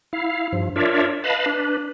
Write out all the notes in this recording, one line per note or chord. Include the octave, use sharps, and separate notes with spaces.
E4 F5
G2 F3
D4 F4 A#4 C#5 D5 E5
B4 D#5 F5 A5 B5
D4 B4